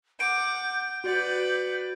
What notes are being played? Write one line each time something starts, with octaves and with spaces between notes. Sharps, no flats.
F#5 D6 G6 D7
F#4 B4 D5 F#5